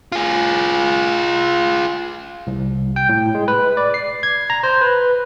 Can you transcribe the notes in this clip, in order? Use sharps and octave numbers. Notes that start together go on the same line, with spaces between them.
F4 G#4
C2
G5
A2
G#3
B4
D5
C7
G#6
A#5
C5
B4